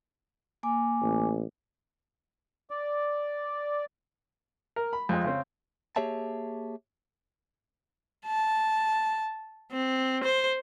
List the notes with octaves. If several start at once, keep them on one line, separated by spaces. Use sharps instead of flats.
A#3 G#5 D6
A1
D5
A#4
B5
F2 G#3
C#3 C4
A#3 G4 G#4 C#5 E5 A5
A5
C4
C5